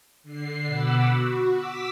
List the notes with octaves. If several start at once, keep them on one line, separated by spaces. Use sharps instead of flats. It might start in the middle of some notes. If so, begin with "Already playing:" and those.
D3 C7
B2 F#5 B5 D6 E6
F#4
D6 E6 B6